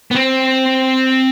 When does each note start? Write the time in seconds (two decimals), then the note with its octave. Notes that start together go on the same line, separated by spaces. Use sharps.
0.11 B3
0.15 C4